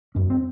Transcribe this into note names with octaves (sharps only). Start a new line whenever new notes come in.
F#2 C#4
C4